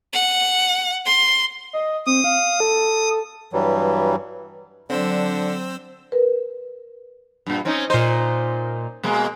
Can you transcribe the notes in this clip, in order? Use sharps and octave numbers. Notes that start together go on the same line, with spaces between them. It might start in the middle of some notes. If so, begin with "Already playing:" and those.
F#5
C6
D#5
C4 D#6
F5
A4
G2 E3 F#3 G3
D3 F#3 C4 D4 C5 E6
A#4 B4
G2 A#2
C4 C#4 D#4
A#2 D#4 C5
B2 G#3 A#3